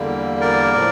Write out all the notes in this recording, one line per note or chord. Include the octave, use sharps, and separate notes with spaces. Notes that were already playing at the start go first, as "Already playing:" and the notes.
Already playing: E2 D3 G3 A#3
A#4 D5
A2 F3